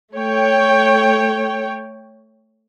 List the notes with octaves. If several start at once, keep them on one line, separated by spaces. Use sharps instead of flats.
A3 C#5 G5